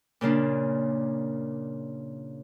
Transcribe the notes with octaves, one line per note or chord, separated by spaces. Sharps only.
A#2 C#3 A#3 D4